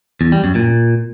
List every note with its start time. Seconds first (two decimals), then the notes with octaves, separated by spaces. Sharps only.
0.21 E2
0.32 G3
0.44 F#2
0.55 A#2